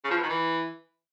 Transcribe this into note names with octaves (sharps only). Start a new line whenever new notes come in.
C#3
F3
B2
D#3
E3